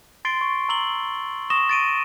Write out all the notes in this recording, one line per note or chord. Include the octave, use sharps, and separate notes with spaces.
C6 A6 C7 D7 G7
C#6
A#5 E6 F#7 G7
C#6 D#6 A#6 E7 G7
A6 D7 D#7